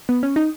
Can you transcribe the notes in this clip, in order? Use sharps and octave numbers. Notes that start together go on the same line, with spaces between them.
B3
C#4
D#4